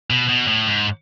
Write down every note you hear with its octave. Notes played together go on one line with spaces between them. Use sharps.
B2
B2
A2
G#2